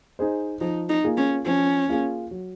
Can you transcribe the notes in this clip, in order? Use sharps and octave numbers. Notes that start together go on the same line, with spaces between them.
D#4 G#4 C5
F3 D#4
D#4
A#3 F4 G#4
C#4
F3 C#4
A#3 F4 G#4
F#3